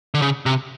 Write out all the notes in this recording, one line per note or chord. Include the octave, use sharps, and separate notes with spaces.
D3
C#3
C3